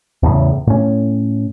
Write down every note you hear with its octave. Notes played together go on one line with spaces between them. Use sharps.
E2 A2 C#3
A2 C#4